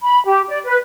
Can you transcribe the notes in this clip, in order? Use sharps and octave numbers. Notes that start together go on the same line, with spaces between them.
B5
G4
D5
B4